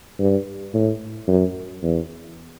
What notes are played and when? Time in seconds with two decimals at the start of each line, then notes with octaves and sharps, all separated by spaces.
0.19 G2
0.74 A2
1.28 F#2
1.82 E2